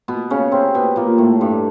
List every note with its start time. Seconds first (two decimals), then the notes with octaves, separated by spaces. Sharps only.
0.08 B2 B3
0.30 C#3 C#4
0.52 C3 C4
0.74 B2 B3
0.96 A#2 A#3
1.18 A2 A3
1.41 G2 G3